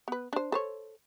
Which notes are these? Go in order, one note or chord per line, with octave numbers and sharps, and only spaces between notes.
B3 B4
D4 C5
A4 C5 C#5